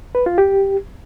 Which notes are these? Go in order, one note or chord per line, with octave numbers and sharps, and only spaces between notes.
B4
F4
G4